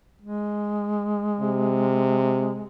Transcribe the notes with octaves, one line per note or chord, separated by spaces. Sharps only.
G#3
C3